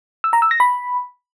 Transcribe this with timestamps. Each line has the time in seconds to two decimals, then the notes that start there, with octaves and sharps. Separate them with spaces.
0.24 E6
0.33 A#5
0.42 E6
0.51 A#6
0.60 B5